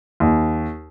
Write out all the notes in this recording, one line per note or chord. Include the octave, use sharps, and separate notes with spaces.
D#2